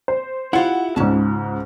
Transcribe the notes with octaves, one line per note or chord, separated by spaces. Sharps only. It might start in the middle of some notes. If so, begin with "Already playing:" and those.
C5
E4 F4 G4 F#5
C#2 G#2 C#4 A5